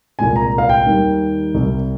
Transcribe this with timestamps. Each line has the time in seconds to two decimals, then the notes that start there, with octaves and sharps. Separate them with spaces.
0.19 C2 A#2 G#3 G#5
0.36 A#5
0.58 F5
0.69 G5
0.86 D#2 D#3 G3
1.54 C2 C3 G3